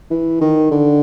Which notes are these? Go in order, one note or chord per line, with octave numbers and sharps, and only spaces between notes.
E3
D#3
D3